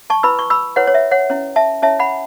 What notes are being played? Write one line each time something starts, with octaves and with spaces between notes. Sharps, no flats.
A5 C#6
E4 B4 B5 E6
C#6
B5 E6
E4 B4 C#5 F#5
C#5
E5
C#5 F#5
C#4 E4 C#5
E5 A5
C#4 E4 C#5 E5 A5
F#5 B5